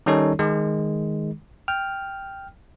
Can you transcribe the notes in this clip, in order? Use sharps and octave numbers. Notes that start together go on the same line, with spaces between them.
D#3 G3 C#4 D#4 A4 C#5
D#3 G#3
G5 F6